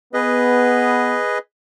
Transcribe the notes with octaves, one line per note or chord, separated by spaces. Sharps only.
B3 G#4 B4 D#5